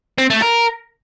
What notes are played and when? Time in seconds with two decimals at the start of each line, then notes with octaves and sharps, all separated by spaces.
0.18 C4
0.30 A3
0.42 A#4